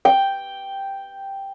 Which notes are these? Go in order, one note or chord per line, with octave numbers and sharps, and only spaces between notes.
G5